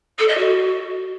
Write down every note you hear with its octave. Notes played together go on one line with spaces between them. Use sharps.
A4
D#5
F#4